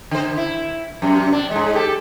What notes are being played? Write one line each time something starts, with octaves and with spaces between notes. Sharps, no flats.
D3 C5
E4
F#2 C3
C4 D4
G#2 G#3
G4 A4